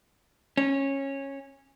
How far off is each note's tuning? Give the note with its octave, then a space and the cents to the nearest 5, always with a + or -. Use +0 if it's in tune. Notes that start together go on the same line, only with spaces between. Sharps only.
C#4 -15